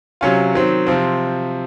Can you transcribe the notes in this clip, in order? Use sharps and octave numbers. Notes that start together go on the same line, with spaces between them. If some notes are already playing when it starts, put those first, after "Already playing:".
C3 F#3 C#4 F4
D#3 F#3 C4
C3 F3 C4